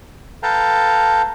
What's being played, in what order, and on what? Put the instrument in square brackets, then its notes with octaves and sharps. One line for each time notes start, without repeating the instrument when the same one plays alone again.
[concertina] A4 B4 F5 G5 A5 A#5